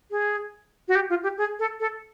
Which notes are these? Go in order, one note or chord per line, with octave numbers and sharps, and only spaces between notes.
G#4
F#4
G4
F4
G4
G#4
A4
A4